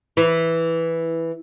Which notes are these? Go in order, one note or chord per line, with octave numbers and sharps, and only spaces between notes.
E3